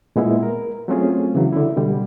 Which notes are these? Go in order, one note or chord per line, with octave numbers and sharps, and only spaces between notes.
A#2 G#3 B3 E4
A#4
F#3 A3 C4 C#4 F4 G#4
C#3 E3 F#3
D3 E4
B2 D3 G3